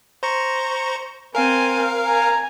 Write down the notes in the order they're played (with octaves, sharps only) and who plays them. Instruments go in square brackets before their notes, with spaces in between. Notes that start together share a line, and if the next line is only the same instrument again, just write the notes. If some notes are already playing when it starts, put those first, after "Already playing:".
[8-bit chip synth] C5 A#5 C#6
[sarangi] C4 [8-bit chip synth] A#4 F5 [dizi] G#5
[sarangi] G#5 [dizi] A#5